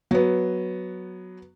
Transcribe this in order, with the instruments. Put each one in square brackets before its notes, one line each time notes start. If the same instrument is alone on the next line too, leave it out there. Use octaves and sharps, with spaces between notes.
[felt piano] F#3 B3